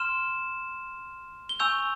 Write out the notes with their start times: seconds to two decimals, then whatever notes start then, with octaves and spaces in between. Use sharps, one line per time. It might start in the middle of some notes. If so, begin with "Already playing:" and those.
Already playing: C6 F6 E7
1.49 G7
1.60 G#5 C#6 E6 G6 F7